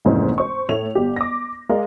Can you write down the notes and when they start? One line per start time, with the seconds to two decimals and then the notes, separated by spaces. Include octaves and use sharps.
0.05 F1 D#2 G#2 E3 C#4 C5
0.38 C5 C#6
0.69 A2 A3 C#5 F7
0.95 G1 G4
1.16 D6 A#6
1.69 G#3 A#4 D5 F5